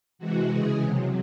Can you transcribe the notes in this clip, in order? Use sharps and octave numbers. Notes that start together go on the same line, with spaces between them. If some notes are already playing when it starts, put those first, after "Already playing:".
C3 E3 G#3 F#4
C#3 E3 G#3 G#4
C3 F#3